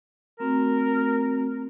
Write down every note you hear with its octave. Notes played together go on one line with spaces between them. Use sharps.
A3 C4 F#4 A#4